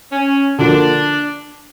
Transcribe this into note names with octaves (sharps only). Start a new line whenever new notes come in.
C#4
D3 F3 A#3 D4